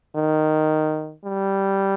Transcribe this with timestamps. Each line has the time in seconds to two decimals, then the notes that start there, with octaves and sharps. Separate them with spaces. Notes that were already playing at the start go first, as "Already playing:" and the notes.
0.16 D#3
1.25 G3